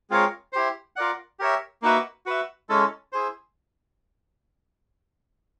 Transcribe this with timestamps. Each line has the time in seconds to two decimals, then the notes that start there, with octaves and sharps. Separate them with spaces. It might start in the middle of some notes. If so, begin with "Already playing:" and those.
0.10 G#3 C4 F4 A#4 C#5
0.53 E4 G4 C5
0.96 F4 A#4 D5 F#5
1.39 G4 A#4 C#5 E5
1.82 A#3 D#4 F#4 B4 E5
2.26 F#4 B4 E5
2.69 G#3 C#4 E4 A4
3.12 E4 G#4 C5